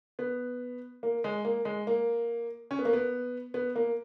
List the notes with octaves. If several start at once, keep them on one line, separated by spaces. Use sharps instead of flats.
B3
A#3
G#3
A#3
G#3
A#3
C#4
B3
A#3
B3
B3
A#3